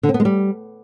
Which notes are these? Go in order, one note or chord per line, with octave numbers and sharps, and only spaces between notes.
D3
C4
B3
G#3
G3